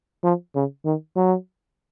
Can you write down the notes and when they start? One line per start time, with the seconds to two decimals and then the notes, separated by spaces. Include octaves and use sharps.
0.24 F3
0.55 C#3
0.85 D#3
1.16 F#3